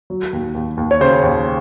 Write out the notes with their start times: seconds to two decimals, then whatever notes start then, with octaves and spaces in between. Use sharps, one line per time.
0.10 F#3
0.33 D#2
0.55 D#2
0.77 D#2
0.91 C#5
1.01 C#3 C5
1.23 D#2